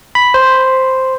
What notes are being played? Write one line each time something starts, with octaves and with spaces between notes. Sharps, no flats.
B5
C5